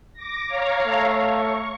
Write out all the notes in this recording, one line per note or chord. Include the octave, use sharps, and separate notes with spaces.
D6 A#6
C#5 F5 A#5
A3
C#6